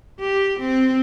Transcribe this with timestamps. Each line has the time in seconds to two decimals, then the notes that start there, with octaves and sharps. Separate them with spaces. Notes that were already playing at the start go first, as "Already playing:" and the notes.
0.20 G4
0.59 C4